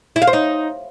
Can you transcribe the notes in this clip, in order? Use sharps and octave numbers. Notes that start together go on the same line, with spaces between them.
E4
F5
C5
D#4